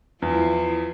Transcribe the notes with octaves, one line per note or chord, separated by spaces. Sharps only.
E2 F3 E4 C5